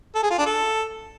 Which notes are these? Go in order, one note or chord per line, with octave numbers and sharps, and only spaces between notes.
A4
G#4
F4
D4
A4